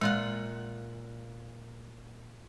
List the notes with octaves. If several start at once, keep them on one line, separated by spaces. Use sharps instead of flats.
A#2 G#3 F4 F#5